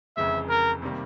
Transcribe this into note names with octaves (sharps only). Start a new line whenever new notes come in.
F1 F2 C#3 E3 G#3 E5
A#4
C3 D#3 G3 A#3